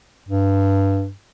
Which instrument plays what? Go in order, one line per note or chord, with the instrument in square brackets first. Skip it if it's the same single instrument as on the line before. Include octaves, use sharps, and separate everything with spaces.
[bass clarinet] G2